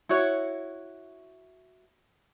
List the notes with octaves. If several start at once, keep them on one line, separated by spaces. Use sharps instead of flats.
E4 F#4 C#5